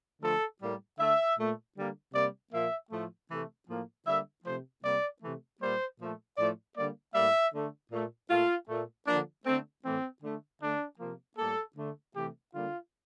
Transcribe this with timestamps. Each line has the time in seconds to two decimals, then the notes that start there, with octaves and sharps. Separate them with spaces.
0.22 D3 F3 A3 A4
0.61 A2 G3 A#3
0.99 D3 A3 E5
1.38 A#2 A3
1.76 D3 G3 A#3
2.14 C3 G3 A#3 D5
2.52 A#2 F3 A#3 E5
2.91 A2 F3 A3
3.29 C3 E3 A3
3.68 A2 F3 A#3
4.06 D3 G3 A#3 E5
4.45 C3 F3 A3 C5
4.84 C3 G3 A#3 D5
5.22 C3 E3 A3
5.61 A#2 G3 A#3 C5
5.99 A#2 F3 A3
6.37 A2 F3 A3 D5
6.76 D3 G3 A#3 D5
7.14 A2 G3 A#3 E5
7.54 D3 A3
7.91 A#2 A3
8.30 A#2 A3 F4
8.69 A#2 A3
9.07 D3 F3 A#3 D4
9.46 D3 A3 C4
9.85 A2 E3 A3 C4
10.22 D3 A3
10.61 D3 A3 D4
11.00 C3 F3 A#3
11.38 A2 G3 A#3 A4
11.76 D3 A3
12.15 C3 E3 A3 G4
12.54 D3 G3 A#3 F4